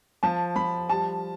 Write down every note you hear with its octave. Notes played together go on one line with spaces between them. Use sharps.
F3 A5
F3 B5
G3 A5